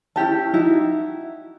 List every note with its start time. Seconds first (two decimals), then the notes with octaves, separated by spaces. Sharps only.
0.16 C#4 E4 G4 A5
0.54 D#4 E4 F#4 E5